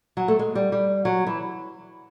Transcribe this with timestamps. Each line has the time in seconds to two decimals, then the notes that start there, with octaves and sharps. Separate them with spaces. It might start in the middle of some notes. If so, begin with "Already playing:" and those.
0.17 F#3
0.28 A3
0.39 G#3
0.55 G3
0.72 G3
1.05 F#3
1.27 E3